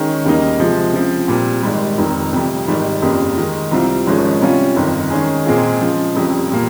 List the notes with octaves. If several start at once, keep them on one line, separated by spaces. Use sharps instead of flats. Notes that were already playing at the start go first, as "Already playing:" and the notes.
Already playing: D#3 G#3 C#4
D#2 C#3 G3 A#3 D#4
C3 F3 G#3
C#3 F3 C4
A#2 G3 C4
G#1 G#2 G3
F1 F2 D#3
F2 C3 G3
G#1 G#2 D#3 G3
G1 F2 C#3 G3 A#3
D#3 G#3 D#4
C2 C3 G3 C4 F4
G#1 G#2 F3 G#3 C#4
C3 G3 C#4 F4
G1 F2 D#3
D#3 G#3 C#4 G#4
A#2 G#3 C4 F4 G#4
C#3 F3 G#3
F1 F2 C#3 G3
A#2 G3 A#3